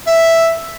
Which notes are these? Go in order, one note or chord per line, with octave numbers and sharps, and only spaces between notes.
E5